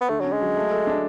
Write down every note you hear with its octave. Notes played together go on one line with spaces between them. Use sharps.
B3
D3 A3
F#3 C#4
G#3
F#3
A3
A4
D4